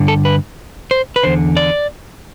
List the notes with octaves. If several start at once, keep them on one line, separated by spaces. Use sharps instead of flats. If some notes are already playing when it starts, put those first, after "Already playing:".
Already playing: G2 D3
A4
B4
C5
B4
E2 D3 C5
D5